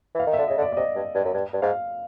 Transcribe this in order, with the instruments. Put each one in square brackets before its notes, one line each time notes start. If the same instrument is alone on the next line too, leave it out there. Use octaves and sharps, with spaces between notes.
[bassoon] E3 [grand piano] F5
[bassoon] D#3
[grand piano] E5
[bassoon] D3
[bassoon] C#3 [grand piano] D#5
[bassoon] D3
[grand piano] D5
D5
[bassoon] C3 [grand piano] D#5
[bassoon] G2
G2
F#2
G2
G2
[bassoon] G#2 [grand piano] F5